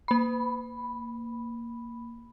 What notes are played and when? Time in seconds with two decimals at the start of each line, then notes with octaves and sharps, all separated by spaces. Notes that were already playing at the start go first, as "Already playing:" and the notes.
0.08 A#3 B5